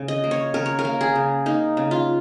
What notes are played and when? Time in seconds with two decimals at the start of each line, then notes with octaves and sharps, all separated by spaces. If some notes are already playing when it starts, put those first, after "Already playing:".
Already playing: C#3
0.08 D#5
0.24 A#3
0.31 C#5
0.54 C#3 A#4
0.66 C#5
0.79 A#4
0.85 A#3
1.01 G#4
1.16 C#3
1.46 A#3 D#4
1.77 C#3
1.91 F4